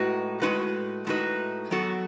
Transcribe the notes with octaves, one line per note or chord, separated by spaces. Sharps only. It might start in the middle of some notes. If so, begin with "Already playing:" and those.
Already playing: A2 G#3 D#4 F#4 B4
A2 G#3 D#4 F#4 B4
A2 G#3 D#4 F#4 B4
F#3 B3 F#4 A4